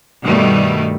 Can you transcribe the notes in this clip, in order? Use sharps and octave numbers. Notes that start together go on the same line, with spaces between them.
G2 B2 D#3 G3 A3